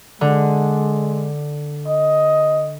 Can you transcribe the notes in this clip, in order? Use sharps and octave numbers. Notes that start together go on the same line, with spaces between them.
D3 G#3
D#5